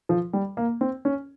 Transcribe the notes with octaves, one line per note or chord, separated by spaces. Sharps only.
F3
G3
A#3
C4
C#4